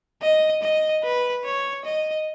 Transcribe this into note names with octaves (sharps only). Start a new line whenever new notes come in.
D#5
D#5
B4
C#5
D#5